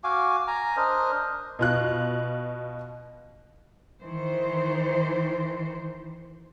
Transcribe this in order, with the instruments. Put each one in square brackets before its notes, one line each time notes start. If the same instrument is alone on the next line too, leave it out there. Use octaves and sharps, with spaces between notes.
[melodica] F#4 F5 G#5 D6
G#5 A#5
D4 A#4 C5 D#5
[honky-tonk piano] B2 F4 F#6
[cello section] D#3 E3 C5